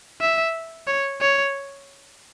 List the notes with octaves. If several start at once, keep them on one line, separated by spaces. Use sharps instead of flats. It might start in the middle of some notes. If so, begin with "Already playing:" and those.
E5
C#5
C#5